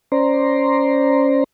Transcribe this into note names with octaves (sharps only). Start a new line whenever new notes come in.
C#4 C5 D5 A#5 C6